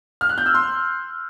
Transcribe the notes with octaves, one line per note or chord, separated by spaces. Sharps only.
F6
F#6
G6
E6
C6